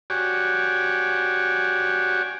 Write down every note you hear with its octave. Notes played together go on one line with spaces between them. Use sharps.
F#4 G4 C#5 D5 G#5